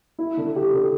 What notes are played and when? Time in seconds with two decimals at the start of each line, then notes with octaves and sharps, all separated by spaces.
0.19 E4
0.37 D3
0.56 G4
0.73 D3